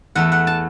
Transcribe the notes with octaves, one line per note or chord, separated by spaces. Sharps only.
E2 E3 A3 F#5
F#5
A5